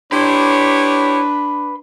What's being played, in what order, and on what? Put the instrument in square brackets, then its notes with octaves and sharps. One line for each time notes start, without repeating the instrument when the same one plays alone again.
[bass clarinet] D4 [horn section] E4 G4 C#5 [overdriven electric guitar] B4 C6